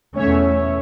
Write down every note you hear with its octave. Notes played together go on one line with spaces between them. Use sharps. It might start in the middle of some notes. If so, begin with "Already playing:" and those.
E2 B2 A3 C#4 C#5 E5